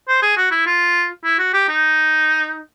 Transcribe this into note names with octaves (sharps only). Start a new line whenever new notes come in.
C5
G#4
F#4
E4
F4
E4
F#4
G4
D#4